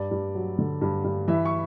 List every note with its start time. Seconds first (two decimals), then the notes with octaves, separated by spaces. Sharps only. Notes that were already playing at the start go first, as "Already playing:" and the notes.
Already playing: G2 D5
0.11 G2
0.35 F#3
0.58 D3
0.81 G2
1.04 G2
1.28 E3 E5
1.45 C#6